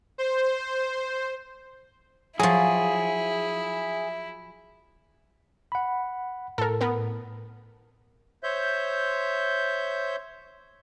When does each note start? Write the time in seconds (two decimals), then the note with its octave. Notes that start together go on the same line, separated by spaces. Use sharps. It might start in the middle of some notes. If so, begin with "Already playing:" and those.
0.18 C5
2.40 F3 F#3 E4 G#4
5.72 F#5 B5
6.58 A2 A4 A#4
6.81 B3 A#4
8.43 C5 C#5 E5 G6